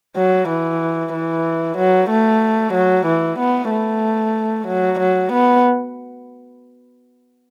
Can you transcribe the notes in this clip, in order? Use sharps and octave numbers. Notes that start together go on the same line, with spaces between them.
F#3
E3
E3
F#3
A3
F#3
E3
B3
A3
F#3
F#3
B3